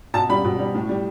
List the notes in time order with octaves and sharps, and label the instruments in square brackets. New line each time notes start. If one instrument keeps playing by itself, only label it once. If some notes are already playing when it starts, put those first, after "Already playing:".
[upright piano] B2 A5
G3 B5
B2
G3
A2
G3